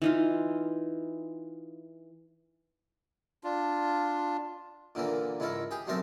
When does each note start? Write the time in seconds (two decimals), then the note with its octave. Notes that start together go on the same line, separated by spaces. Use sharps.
0.02 E3 D#4 F4
3.44 D4 F4
4.95 A#2 D3 E3 A#3
5.40 C#2 G#2 E4 A4 A#4
5.71 G4 G#4 G#5
5.87 B1 F#2 A3 C4 A#4 A5